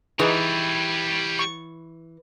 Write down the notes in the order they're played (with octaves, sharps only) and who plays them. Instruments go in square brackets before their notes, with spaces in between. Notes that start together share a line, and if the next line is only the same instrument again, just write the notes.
[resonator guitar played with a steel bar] E3 [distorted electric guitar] G3 C#5 [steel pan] D#4 G#4 B4
[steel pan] C#6